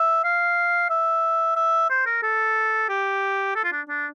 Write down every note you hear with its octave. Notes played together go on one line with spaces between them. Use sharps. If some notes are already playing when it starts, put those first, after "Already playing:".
Already playing: E5
F5
E5
E5
C5
A#4
A4
G4
A4
F4
D4
D4